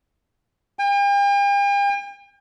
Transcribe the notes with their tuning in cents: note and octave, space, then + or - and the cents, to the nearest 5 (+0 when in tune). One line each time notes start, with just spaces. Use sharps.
G5 +45